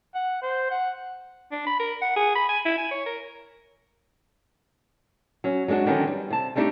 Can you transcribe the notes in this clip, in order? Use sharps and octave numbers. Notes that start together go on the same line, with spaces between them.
F#5
C5
F#5
D4
B5
A#4
F#5
G#4
B5
G#5
E4
G#5
C#5
A#4
F#3 C#4
F#3 G#3 C#4 D4 F#4
D3 D#3 F#3 B3 C#4 D#4
G3
C3 A5
G3 A3 D4 D#4 F#4 G4